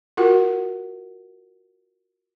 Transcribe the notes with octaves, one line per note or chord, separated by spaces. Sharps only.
F4 F#4 A#4 F#5